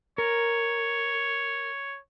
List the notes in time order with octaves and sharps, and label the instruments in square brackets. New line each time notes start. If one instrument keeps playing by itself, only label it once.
[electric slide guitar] A#4 [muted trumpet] C#5